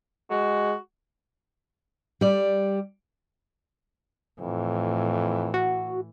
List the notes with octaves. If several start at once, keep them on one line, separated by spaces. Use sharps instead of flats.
G#3 F#4
G3 D5
F2 A2 E3
F#4